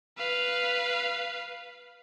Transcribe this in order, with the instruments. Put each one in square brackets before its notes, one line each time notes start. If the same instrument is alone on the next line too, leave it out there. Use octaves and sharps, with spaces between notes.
[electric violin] B4 F5